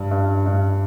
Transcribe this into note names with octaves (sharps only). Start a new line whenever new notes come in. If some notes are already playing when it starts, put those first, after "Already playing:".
Already playing: G2
G2
G2